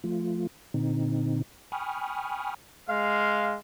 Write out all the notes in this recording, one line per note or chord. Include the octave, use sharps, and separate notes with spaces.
F3 A3 F4
A#2 D3 C4 D#4
G5 G#5 B5 C#6 D#6 F6
G#3 F5